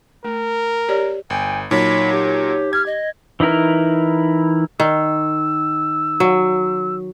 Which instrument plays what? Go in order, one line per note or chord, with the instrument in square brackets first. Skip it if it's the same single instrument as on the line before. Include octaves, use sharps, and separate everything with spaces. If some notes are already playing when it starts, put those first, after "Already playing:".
[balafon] A3 [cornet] A#4
[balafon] G4 C#5 D5
[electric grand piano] G1 [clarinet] G5 [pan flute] G#5
[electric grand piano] A#2 F#3 [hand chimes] D#4 [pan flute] C#5 [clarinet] B5
[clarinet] G4
[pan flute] F6 [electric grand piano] G#6
[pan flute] D#5
[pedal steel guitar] E3 D#4 E4 A#4
[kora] D#3 [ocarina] E6
[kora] F#3